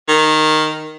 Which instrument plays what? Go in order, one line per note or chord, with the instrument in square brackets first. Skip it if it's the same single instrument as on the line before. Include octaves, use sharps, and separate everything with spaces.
[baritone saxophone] D#3